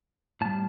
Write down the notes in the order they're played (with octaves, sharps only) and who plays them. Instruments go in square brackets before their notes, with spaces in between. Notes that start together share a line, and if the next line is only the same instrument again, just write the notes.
[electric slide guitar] A2 G3 A5